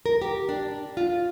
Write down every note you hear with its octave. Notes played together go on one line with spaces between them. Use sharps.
A#4
G4
D4
F4